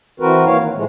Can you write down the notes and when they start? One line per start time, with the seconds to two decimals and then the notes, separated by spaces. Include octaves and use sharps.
0.20 E3 C4 F#4 A#4 B4
0.46 E3 A#3 C#5 F5
0.61 D#3
0.75 A2 F3 G#3 A3